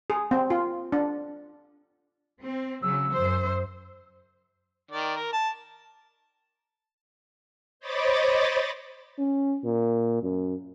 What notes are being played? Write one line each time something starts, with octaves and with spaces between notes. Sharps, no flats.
G#4
C4
F4
D4
C4
C#3 F#3 E6
F#2 C5
D#3 D5
A#4
A5
C5 C#5 D#5 B5 D6 A6
C#4
A#2
F#2